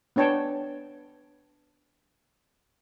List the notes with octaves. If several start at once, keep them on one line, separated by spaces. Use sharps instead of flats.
B3 D4 C#5 G5 A5